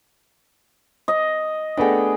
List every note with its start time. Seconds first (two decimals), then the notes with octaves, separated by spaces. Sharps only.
1.08 D#5
1.77 A3 B3 D4 G#4 G5